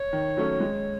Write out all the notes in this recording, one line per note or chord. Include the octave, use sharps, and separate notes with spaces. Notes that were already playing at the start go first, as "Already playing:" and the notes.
Already playing: C#5
D#3
F#3 A3 C#4
G#3